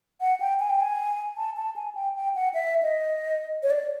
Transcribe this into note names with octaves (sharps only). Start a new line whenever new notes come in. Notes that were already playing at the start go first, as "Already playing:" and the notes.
F#5
G5
G#5
G5
G#5
A5
A5
G#5
G5
G5
F#5
E5
D#5
C#5
D5